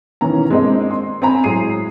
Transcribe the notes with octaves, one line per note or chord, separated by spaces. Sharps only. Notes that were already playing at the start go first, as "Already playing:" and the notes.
B2 D#3 E3 C#4 A#5
G#3 A#3 C4 D4 D#5
C6
C4 C5 G#5 A#5 B5
A2 F#3 G#3 G#4 C7 D#7